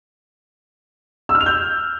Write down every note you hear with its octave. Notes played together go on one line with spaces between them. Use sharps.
E6
F6
F7
G6